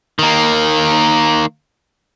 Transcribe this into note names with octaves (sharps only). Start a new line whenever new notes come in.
D#3 A#3